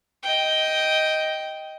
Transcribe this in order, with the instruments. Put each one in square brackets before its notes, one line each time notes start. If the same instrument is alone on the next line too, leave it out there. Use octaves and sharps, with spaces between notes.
[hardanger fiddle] D#5 G5